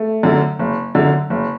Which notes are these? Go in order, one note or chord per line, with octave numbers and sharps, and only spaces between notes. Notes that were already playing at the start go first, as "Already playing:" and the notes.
Already playing: A3
F#2 D3
F#1
F#2 D3
F#1